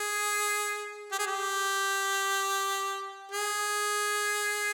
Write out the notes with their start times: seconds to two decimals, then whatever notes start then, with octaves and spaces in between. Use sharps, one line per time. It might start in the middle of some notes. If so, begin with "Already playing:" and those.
Already playing: G#4
1.12 G4
1.19 G#4
1.27 G4
3.32 G#4